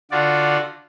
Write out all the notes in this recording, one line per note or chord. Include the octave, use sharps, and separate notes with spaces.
D3 F4 F#4 D5